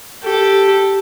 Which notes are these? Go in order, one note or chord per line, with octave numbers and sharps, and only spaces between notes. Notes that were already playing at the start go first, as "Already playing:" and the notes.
G4 A4